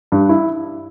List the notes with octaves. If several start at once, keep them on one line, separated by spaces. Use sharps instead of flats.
G2
E4